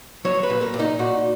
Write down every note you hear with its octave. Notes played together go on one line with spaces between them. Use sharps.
F#3 C#5
B4
A#2
A#4
A#2
D#4
A#2 F#4